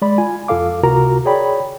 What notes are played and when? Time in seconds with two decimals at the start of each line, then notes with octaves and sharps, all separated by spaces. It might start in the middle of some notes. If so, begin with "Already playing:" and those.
0.02 G#3 D5 B5
0.18 F4 G#5
0.48 F2 F4 A4 F5 D6
0.83 C#2 C3 F4 F#4 A#4 A#5
1.25 G#4 C#5 D5 G5 B5